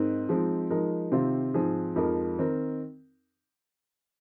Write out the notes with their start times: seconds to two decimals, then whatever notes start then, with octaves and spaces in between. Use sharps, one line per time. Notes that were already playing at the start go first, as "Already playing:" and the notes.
Already playing: G#2 C4 D#4 A#4
0.29 F3 G#3 C4 D#4
0.70 F3 G#3 D#4 A#4
1.12 C3 D#3 C4 F4
1.54 G#2 F3 C4 G#4
1.96 F2 F3 G#3 D#4 A#4
2.38 D#3 C4 D#4 A#4